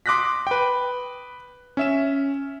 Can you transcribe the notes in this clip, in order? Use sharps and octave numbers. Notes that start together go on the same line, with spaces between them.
C6 D6 D#6 F#6 A#6 B6
B4 G5
C#4 E5 E7